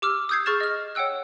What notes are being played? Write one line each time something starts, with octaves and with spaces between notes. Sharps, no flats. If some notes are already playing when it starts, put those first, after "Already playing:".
G4 D6 E6 F6
D#6 E6 G6 G#6 C7
G#4 C#6 F6 A6 E7
D#5 F6
C#5 F#5 G5 E6 F#6